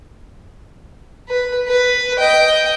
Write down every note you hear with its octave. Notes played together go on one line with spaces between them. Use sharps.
B4
B4
D#5 G5